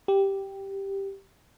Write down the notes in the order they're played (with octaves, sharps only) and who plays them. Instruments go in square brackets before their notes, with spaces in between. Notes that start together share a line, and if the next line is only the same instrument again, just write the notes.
[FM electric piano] G4